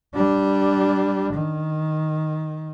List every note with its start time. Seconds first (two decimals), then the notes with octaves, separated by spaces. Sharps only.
0.15 G3 D4
1.33 D#3